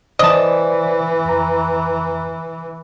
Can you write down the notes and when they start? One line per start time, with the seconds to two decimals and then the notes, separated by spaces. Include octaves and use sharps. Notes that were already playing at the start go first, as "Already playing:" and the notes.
0.19 E3 C5 D5 D#5 A5
1.25 F2 A#5